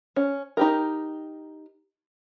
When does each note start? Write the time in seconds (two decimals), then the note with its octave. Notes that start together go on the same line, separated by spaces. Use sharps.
0.16 C#4
0.57 D#4 G4 A#4